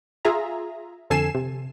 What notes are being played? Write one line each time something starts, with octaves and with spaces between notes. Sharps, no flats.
F4 G#4 E5 A#5
F2 D3 A4 G#5 C7 E7
C3